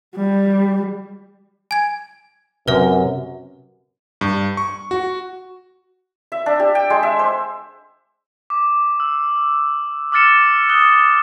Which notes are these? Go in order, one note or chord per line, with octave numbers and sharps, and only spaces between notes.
G3
G#5 G#6
F#2 C3 B4 E5
G2
C#6
F#4
E5
D4
G4
G5
G#3
E5
C5
D6
E6
D6 E6 F6 A6 C#7 E7
D#6 F#6 G7